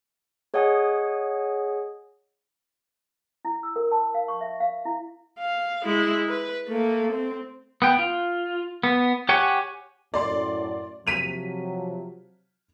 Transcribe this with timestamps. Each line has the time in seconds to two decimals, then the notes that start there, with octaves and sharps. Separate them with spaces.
0.54 G#4 C#5 D#5 F#5 G#5 D#6
3.45 E4
3.63 E6
3.76 A#4
3.92 A5
4.14 F5
4.28 C#6
4.41 E5
4.60 F5
4.85 E4
5.39 F5
5.85 G#3 E4
6.28 B4
6.68 A3 A#3
7.13 C4
7.82 B3 G5
7.99 F4
8.83 B3
9.29 G4 C#5 F#5 G#5
10.14 F#2 A2 D5 C6
11.07 C3 F3 F#3 B6 D#7 F7